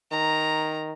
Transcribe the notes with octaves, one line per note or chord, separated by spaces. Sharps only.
D#3 A#5